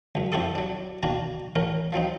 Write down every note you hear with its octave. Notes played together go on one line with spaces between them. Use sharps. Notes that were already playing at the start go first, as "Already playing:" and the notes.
C#2 F#2
F2 E4 F#4 G4 A4 D#6
F#3 D4
B2 D#3 A#3 D4 F#4
A1 C#4 A#4
F3 F#3 C4 D#4